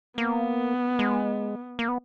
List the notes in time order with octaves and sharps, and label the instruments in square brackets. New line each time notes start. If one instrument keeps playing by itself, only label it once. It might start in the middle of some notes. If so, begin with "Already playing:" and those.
[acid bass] A#3 [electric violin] B3
[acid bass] G#3
A#3
B3